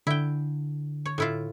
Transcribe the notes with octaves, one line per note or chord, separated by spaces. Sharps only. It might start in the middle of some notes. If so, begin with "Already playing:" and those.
D3 E4 G5
C#5
A2 E4 F4